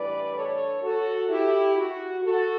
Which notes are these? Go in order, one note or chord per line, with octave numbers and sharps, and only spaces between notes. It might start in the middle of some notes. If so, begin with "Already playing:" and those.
Already playing: A2 E3 G3 D4 B4 D5
A4 C#5
F#4 A4
E4 G4
F#4
F#4 A4